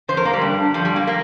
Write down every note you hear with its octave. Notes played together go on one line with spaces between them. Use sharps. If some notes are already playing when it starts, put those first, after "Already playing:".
F2 D3 C5
A#4
A#3
G3
G2 D3
G2 D3 F3
G3
A#3
A#3